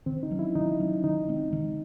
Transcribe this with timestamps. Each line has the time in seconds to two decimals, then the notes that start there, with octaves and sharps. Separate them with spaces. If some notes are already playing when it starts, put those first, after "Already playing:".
0.06 D#3 C4
0.23 D#4
0.31 F#3 C#4
0.39 E4
0.55 D#3 D#4
0.80 F#3 C#4
1.04 D#3 D#4
1.28 G#3 C4
1.53 D#3